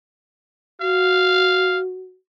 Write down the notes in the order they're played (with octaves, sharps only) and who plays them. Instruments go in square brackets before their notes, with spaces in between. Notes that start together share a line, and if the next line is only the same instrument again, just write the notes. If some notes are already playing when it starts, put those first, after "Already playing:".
[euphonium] F#4 [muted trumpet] F5